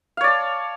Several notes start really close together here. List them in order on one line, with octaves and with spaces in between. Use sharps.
F5 C#5 D5 A5